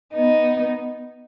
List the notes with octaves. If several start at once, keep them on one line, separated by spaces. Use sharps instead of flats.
B3 D#4